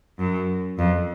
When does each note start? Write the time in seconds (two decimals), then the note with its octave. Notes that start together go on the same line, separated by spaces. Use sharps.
0.19 F#2
0.78 F2